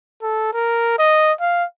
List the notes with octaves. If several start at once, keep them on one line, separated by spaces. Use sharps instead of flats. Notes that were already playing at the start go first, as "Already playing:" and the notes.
A4
A#4
D#5
F5